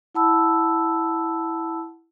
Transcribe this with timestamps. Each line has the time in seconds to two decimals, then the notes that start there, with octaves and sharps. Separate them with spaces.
0.15 E4 F#5 A5 B5 E6